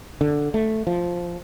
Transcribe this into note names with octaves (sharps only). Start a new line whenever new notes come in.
D3
A3
F3